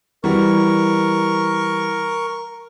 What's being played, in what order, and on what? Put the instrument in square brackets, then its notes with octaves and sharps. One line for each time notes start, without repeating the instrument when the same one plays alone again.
[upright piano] E3 G3 F#4 [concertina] A#4 C#6